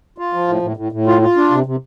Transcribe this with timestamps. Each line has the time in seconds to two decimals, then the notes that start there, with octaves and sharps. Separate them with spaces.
0.18 F4
0.33 F3
0.48 A2
0.62 A2
0.77 A2
0.92 A2
1.07 F4
1.22 F4
1.37 D4
1.51 C3
1.66 C3